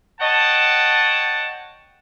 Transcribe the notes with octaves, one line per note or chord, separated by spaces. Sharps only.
C#5 D#5 F#5 G5 A5